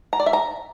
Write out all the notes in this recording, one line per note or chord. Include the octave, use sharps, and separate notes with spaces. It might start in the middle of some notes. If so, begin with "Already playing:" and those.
A#5
D5
E5
A#5